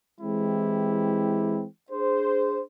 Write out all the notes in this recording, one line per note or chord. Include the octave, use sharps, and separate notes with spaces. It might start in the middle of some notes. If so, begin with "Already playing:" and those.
E3 G#3 C4 E4 G4
D4 G#4 C5